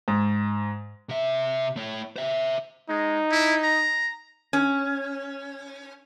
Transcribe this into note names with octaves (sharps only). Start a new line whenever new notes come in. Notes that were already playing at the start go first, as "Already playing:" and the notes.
G#2
C3 E5
A3 C#5
C5 E5
G#3 D#4
E4
A#5
C#4